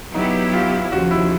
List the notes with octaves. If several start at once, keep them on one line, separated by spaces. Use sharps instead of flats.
F#3 B3 D#4 E4 G4
F4
D#2 C#3 F3 F#4
E4